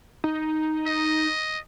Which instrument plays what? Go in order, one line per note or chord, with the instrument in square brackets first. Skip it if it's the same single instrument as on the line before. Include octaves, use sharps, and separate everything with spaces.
[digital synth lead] D#4
[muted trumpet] D#5